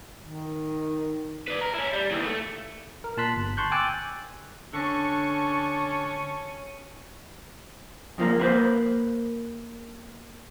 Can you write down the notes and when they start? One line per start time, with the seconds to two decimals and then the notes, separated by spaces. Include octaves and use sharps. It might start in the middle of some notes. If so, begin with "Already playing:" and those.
0.23 D#3
1.48 B4 D5
1.61 A#4
1.75 C#4 E4
1.93 G3
2.11 D#2 E3
2.25 A3
3.04 A#4
3.17 A#2 A5 C6 F#6 B6
3.36 G1
3.57 A5 C6 C#6 F#6 G6
3.72 G5 G#5 D6 E6 F#6 A6
4.73 D3 C#4 A5 C#6
8.18 F2 F3 A#3
8.39 A#3 B4 C5